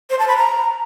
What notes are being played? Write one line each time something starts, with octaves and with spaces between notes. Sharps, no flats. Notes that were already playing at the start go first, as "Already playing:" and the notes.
C5
A5
B5
A#5